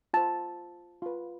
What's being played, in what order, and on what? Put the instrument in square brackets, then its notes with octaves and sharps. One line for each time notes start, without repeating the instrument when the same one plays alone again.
[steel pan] F4 C5 A5
F4 B4